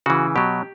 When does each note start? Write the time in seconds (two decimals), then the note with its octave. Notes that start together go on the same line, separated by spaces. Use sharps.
0.06 C#3 E3 F#4
0.36 B2 F#3 G4